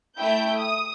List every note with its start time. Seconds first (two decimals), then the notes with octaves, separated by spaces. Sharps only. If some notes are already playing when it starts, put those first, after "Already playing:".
0.16 A3 E4 G5 G6
0.58 D#6